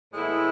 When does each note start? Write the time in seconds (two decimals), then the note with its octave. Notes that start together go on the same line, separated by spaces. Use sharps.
0.13 A2 E3 G#3 B3 E4